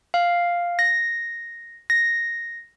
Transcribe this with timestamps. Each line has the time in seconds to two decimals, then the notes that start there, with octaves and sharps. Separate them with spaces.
0.14 F5
0.79 A#6
1.90 A#6